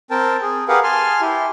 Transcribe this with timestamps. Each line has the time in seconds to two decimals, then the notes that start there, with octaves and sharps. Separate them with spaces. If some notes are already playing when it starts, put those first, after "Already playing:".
0.11 C4 A#4 G5 A5
0.42 G#4
0.68 G4 G#4 A#4 B4 F5 F#5
0.84 G#5 A5 C6 F6
1.21 E4 G4